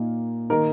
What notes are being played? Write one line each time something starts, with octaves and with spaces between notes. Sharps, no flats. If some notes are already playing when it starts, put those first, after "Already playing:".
Already playing: A#2 A#3 D#4
D#3 A#3 D#4 A#4